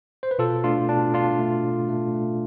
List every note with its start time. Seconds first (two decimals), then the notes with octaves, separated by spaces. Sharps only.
0.23 C5
0.31 B4
0.39 B2 F4 A4
0.64 A3 D4 F4
0.89 B2 D4
1.14 B2 D4 F4
1.39 A3
1.64 A3
1.89 A3
2.14 A3